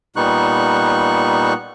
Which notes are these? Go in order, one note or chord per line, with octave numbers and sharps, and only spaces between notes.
A#2 G3 B3 D#4 C#6 F#6